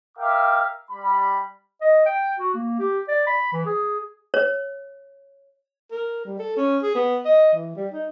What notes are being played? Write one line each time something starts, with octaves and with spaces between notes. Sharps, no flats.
A#4 E5 F5 G5 D6
G3 B5
D#5
G5
F#4
A#3
G4
D5
B5
E3
G#4
C#5
A#4
G3
A4
C#4
G#4
B3
D#5
E3
G3
D#4